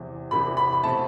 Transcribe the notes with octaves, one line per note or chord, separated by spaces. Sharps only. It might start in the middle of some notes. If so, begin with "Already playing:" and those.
Already playing: E2 C3 E3
E2 C3 E3 B5
B5
B5
B2 A3 C4 A5